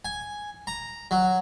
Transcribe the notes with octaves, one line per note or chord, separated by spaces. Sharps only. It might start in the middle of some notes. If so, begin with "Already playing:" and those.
G#5
A#5
F#3